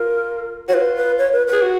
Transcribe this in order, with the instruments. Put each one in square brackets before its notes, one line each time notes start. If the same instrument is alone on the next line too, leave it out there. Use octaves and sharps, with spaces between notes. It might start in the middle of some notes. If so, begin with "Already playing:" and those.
Already playing: [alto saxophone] F4 [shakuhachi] A#4
[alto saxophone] F#4 [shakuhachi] C#5
[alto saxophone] F4 [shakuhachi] B4
[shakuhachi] B4
C#5
B4
B4
[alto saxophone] G#4
F#4